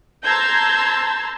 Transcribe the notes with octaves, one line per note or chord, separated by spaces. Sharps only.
A5 A#5 C6 E6 G6 G#6